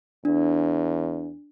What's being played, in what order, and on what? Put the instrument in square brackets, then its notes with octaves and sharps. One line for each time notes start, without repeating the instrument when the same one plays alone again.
[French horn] E2 [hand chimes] D4